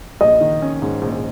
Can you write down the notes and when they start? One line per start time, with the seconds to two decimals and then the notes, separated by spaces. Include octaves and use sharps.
0.21 A#1 D#5
0.41 D#3
0.62 C#4
0.82 G#2
1.02 A#1